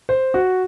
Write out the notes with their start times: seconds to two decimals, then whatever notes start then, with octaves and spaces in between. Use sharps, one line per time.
0.09 C5
0.34 F#4